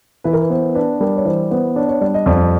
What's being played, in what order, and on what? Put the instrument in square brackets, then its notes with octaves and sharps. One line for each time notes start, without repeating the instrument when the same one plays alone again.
[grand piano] E3 [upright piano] B4
[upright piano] A#4
B4
[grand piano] B3 [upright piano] C5
[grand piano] D4 [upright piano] B4
[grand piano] G3 [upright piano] A#4
[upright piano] C#5
[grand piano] E3 [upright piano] C5
[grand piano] B3 [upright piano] C5
[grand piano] D4 [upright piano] C#5
[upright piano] C#5
[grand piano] G3 [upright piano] D5
[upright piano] D#5
[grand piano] F2 [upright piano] D5